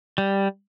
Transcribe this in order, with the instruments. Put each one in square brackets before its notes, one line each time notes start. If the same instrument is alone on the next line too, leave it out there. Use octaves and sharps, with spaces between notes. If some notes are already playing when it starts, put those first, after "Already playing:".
[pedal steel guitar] G3